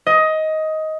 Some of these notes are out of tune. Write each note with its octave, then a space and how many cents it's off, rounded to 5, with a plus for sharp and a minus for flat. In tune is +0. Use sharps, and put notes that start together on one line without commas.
D#5 +15